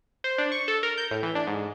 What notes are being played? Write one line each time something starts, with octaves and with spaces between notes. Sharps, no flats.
C5
D4
C#6
A4
A#4
G6
A2
E3
D4
G#2